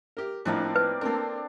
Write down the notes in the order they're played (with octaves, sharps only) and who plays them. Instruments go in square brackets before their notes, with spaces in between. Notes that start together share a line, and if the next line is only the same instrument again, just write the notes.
[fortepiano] G4 A#4
[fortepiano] A2 F3 D#4 [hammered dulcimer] A#3 C4 D4
[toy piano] B4
[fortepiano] A#3 C4 A#4 [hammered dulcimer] D4 A4